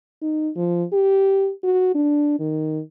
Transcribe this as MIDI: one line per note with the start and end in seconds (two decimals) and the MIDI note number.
0.22 0.50 63
0.56 0.84 53
0.93 1.50 67
1.64 1.92 66
1.95 2.37 62
2.40 2.80 51